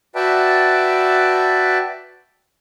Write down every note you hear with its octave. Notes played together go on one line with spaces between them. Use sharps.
F#4 B4 D5 E5 G5 A5